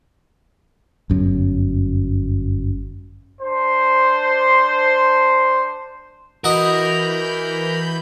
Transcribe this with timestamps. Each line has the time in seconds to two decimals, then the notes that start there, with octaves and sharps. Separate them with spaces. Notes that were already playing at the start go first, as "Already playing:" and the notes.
1.10 G1 F#2
3.42 D4 C5
6.44 E3 F#4 A#4 D#5 B5 G6